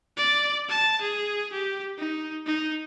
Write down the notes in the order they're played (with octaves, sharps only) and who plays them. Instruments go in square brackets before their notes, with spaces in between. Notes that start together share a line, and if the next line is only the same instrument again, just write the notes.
[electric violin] D5
A5
G#4
G4
D#4
D#4